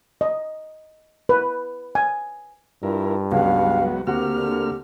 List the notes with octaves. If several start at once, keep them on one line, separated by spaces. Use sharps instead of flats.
D#5
B4
G#5
G2 E4 F4 A#4
C#2 F#3 G#3 B3 F#4 F5
D2 A#3 C4 F#4 G4 F#5 F6
D3